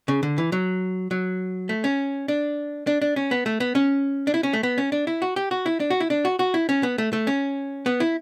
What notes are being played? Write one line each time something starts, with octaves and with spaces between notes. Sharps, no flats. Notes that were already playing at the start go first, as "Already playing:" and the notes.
C#3
D3
E3
F#3
F#3
A3
C#4
D4
D4
D4
C#4
B3
A3
B3
C#4
D4
E4
C#4
A3
B3
C#4
D4
E4
F#4
G4
F#4
E4
D4
F#4
E4
D4
F#4
F#4
E4
C#4
B3
A3
A3
C#4
B3
E4